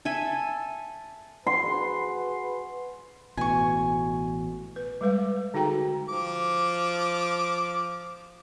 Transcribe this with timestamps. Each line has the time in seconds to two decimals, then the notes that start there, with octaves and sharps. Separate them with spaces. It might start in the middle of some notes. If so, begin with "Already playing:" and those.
0.05 A4 E5 G#5
1.47 F#4 G#4 B4 C6
3.37 A1 B2 G#5 C#6
4.76 B4
5.01 G3 G#3 B4 F5
5.54 D3 D#4 F#4 G#4 G5 A#5
6.09 F3 D6